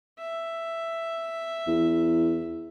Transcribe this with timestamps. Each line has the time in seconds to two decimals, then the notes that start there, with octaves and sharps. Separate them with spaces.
0.18 E5
1.68 E2